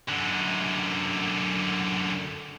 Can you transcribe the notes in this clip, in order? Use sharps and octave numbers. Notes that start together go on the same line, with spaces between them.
F#2 D3